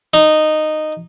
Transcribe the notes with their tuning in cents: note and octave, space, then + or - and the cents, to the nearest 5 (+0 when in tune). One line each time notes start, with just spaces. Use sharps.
D#4 -10